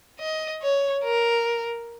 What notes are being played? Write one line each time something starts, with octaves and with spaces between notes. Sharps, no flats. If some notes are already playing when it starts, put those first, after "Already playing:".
D#5
C#5
A#4